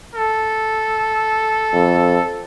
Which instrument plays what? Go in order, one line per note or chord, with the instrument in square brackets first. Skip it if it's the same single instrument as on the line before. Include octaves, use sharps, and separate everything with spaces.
[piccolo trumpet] A4
[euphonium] F2